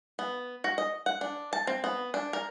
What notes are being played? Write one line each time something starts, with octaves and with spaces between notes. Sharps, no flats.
B3
F#4
D#5
F#5
D4
A5
C4
B3
D4
A#4